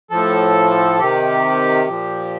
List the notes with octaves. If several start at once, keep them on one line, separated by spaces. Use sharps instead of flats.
A2 F3 A4
C3 D#3 G4
A#2 F3